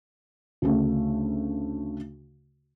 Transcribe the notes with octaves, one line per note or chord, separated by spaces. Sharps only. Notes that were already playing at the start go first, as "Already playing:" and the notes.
D2 C#3 A3